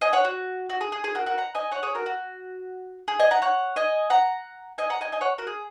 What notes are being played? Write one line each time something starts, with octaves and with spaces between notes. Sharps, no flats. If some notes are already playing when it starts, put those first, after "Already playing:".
D#5 G#5
C#5 F#5
F#4
F#4
G#4
G#4
G#4
F#4 A#4
F#4 A#4
F#5 A#5
D#5 G#5
C#5 F#5
G#4 C#5
F#4 A#4
F#4
G#4
D#5 G#5
F#5 A#5
C#5 F#5
D#5 G#5
F#5 A#5
D#5 G#5
F#5 A#5
D#5 G#5
D#5 G#5
C#5 F#5
F#4 A#4
G#4